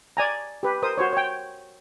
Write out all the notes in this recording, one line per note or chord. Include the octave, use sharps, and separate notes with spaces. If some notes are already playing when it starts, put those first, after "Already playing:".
D5 G#5 A#5
G4 B4
A#4 C5 D#6
F#4 C5 C#5
C#5 G5